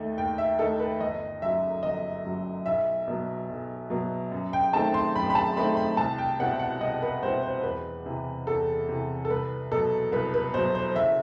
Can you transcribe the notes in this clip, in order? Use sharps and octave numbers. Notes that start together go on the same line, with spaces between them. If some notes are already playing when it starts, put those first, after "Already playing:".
Already playing: D#2 D#3 A3 D#4
D#2 G5
E5
D#3 A3 D#4 A4
B4
G1 D#5
F#2 F#3 E5
G1 D#5
F#2 F#3
B1 E5
B2 F#3 B3
B1
B2 F#3 B3
F#2
G5
D#3 A3 C4 D#4 A5
C6
F#2 B5
B5
A5
D#3 A3 C4 D#4 B5
B5
C2 A5
G5
B2 G3 C4 E4 F#5
F#5
C2 D#5
B4
B2 G3 C4 E4 C5
C5
E2 B4
C3 E3
E2 A4
C3 E3
A4
C2 B4
B2 F#3 A4
C2 B4
B4
B2 F#3 C5
C5
F#1 E5